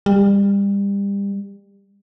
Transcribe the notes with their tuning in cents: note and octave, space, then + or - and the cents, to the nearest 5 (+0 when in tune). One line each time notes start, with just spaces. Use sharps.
G3 +30